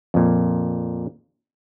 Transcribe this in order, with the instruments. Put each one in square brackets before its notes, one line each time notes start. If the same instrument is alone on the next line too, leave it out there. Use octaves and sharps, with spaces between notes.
[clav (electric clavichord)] F2 A#2